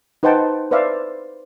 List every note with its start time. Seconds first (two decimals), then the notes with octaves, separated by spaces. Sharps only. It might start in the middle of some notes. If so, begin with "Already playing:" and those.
0.23 D#4 B4 C5 F#5 G5 A5
0.71 B4 C5 D5 E5 F5